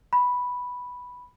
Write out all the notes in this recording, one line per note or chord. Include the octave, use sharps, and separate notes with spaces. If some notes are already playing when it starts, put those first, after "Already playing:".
B5